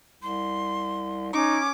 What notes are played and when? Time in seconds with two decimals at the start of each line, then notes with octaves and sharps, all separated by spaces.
0.22 C2 C6
1.33 C#4 D#4 D6